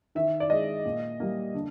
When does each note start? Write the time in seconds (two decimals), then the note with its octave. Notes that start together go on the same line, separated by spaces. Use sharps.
0.15 D#3 E5
0.40 D5
0.50 G#3 D#5
0.85 A#2
1.20 G3 A#3
1.54 D3